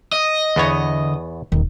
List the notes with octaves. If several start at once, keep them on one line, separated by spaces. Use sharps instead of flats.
D#5
E2 D3 B3 C#5
D#1 D#3